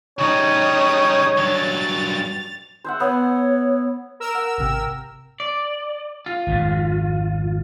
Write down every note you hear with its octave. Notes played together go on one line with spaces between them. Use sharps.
C#3 G3 D#4 C#5 D#6
G2 F#3 A6 F7
C5 E5 F#5
B3 C#5
A#4 E6
F#5
G#1 C3 G5
D5
F4
G#1 F2 G#2